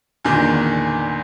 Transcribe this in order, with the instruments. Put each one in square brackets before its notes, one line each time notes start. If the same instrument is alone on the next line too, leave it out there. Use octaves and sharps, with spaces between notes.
[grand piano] E2 A#2 D3 D#3